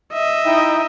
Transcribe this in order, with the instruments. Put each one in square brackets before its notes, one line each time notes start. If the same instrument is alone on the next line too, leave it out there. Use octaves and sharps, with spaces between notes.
[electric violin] D#5 E5
[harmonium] D#4 E4 G5